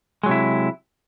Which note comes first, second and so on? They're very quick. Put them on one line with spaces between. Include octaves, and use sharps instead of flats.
G#3 F#3 C3 E4